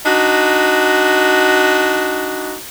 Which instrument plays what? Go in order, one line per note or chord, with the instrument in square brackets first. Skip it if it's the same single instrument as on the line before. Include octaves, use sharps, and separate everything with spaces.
[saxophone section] D4 D#4 F#4